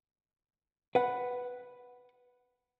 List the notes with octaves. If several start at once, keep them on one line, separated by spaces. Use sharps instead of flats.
B4 F#5